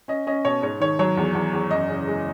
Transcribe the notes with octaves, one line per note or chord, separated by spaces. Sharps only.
C#4 D#5
C#4 D#5
B2 C#5
G#2 C#5
D#3 C#5
F#3 C#5
E2
E2
E2
F#2 D#5
C#3
G#3